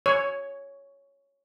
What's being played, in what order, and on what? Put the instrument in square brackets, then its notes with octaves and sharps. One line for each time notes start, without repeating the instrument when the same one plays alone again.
[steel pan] C#5